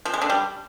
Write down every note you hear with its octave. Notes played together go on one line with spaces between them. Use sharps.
F3
G#3
D3
G3